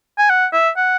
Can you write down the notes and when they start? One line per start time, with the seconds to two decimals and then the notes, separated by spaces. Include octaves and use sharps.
0.18 G#5
0.30 F#5
0.53 E5
0.77 F#5